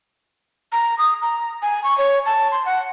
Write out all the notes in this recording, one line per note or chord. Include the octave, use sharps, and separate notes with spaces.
A#5
D#6
A#5
G#5
C#6
C#5
A5
C6
F#5